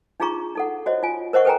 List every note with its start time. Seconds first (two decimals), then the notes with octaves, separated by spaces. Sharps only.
0.20 D4 D#4 F4 G#4 A#5 C#6
0.55 D#4 A4 F#5
0.86 F#4 C5 C#5 D#5
1.03 F4 G#5
1.33 A#4 C5 D#5 F#5 C#6
1.45 A4 B4 G5 G#5 A#5